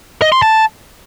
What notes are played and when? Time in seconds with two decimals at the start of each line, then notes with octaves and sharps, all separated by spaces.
0.22 D#5
0.32 C6
0.42 A5